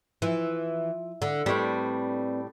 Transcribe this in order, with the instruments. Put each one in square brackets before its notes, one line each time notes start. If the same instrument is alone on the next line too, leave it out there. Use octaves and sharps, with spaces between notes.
[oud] E3 [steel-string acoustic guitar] F3
[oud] D3
[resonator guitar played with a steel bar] A2 G3 [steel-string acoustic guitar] C4 B4 D5 [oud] D4